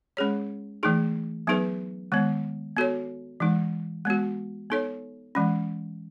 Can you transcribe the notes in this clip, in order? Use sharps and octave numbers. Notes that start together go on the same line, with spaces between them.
G#3 C#4 G#4 C#5
E3 A3 D#4 G#4
F#3 B3 D#4 G#4 B4
D#3 G#3 B3
B3 F#4 A4 C#5
E3 G#3 D#4
G#3 B3 F#4
B3 D#4 A4 C#5
E3 G#3 C#4